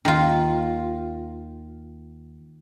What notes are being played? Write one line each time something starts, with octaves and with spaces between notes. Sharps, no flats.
D#2 D#3 F4